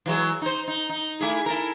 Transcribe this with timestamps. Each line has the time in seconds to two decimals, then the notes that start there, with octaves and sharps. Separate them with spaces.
0.06 E3 F#3 G#3
0.42 D#4 C5
0.68 D#4
0.90 D#4
1.21 A3 E4 G#4
1.46 E4 A4 A#4